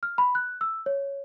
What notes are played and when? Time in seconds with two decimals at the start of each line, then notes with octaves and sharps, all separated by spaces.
0.03 F6
0.18 B5
0.35 F#6
0.61 E6
0.86 C#5